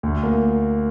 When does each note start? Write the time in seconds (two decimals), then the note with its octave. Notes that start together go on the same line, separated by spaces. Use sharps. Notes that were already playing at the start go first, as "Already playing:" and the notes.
0.03 D2
0.23 A#3